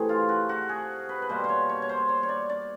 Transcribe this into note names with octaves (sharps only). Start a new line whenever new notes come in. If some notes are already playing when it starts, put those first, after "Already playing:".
Already playing: C3 E3 A3 G#4
F4
F#4
F#4
G#4
B4
B4
B2 G3 A#3 C5
C5 C#5
C#5
C#5
C5
C#5
C#5
D5
D5